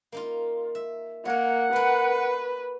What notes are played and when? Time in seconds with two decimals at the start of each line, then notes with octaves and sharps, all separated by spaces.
0.12 A#3 D#4 F4
0.75 E5
1.25 A#3 A#4 C#5 F#5
1.73 F#4 A#4 B4